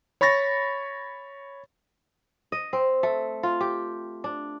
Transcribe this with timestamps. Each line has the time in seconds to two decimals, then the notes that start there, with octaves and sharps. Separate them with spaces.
0.21 C#5 B5 C#6 A6 A#6
2.52 D#5
2.73 C4
3.03 A3
3.43 F4
3.61 G4
4.24 D4